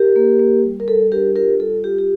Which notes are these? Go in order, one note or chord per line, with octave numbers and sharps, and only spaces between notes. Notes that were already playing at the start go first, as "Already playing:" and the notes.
Already playing: G4 A#4
A#3
A#3
G3
A#4
G3 A4
D4 G4 A#4
F4 G4 A#4
G3 A4
F4 G4
G4